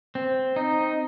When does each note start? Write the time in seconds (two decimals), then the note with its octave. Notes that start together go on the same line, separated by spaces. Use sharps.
0.15 C4
0.56 D#4